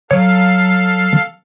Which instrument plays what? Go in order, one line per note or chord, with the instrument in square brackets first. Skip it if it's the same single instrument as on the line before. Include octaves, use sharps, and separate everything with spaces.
[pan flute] F#3 [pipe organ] A4 F5 [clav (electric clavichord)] C#5